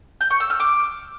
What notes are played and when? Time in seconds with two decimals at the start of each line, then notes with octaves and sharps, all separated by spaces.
0.21 G6
0.30 C#6
0.40 E6
0.50 F6
0.60 D6